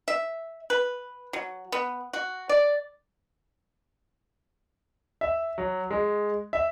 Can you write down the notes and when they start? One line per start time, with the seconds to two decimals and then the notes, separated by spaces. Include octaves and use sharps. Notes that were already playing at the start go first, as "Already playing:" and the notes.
0.08 E5
0.70 B4
1.33 F#3
1.72 B3
2.13 F#4
2.49 D5
5.21 E5
5.58 F#3
5.91 G#3
6.53 E5